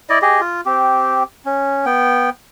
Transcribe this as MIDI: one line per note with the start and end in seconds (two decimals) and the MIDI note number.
0.10 0.19 64
0.10 0.19 74
0.10 0.19 75
0.22 0.41 67
0.22 0.41 68
0.22 0.41 75
0.41 0.61 65
0.66 1.23 60
0.66 1.23 67
1.45 1.85 61
1.86 2.30 59
1.86 2.30 79